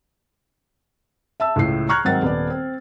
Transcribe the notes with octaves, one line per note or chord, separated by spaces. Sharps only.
E5 A5 E6
C#2 A2 C7
A#5 C#6 F6 F#6 G#6
G#2 D#3 F#3 C4 F#5 A6
D#1 B3 D5
C4